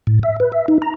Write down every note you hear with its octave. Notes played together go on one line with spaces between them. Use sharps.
A2
E5
B4
E5
D#4
A#5